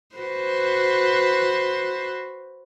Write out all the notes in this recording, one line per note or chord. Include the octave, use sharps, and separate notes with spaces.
F#4 B4 C5